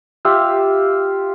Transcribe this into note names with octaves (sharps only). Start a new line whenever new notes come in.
F4 G4 E5 F5